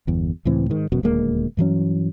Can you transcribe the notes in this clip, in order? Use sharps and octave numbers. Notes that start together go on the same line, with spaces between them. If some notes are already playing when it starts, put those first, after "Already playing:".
G1 E2
C#2 A2 E3 C4
G#2 D#3
E1 F#2 B2
D#1 D2 G#3 A#3
G2 E3 F#3 C#4